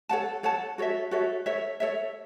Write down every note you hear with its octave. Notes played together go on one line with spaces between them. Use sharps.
A4 C#5 F#5 A5
A4 C#5 F#5 A5
F#4 A4 C#5 E5
F#4 A4 C#5 E5
A4 C#5 E5
A4 C#5 E5